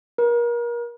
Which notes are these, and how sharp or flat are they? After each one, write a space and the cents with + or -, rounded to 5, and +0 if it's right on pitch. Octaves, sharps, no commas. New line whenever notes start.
A#4 +35